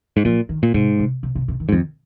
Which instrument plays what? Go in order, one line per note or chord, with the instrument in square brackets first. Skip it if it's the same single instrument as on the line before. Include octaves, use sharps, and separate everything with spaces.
[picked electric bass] G#2
[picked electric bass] A#2 [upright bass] F3
[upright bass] D#3
[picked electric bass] A#2
[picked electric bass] G#2 [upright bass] C3
[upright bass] C3
C3
C3
C3
D#3
[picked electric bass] G#2
[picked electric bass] F2 [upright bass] D#3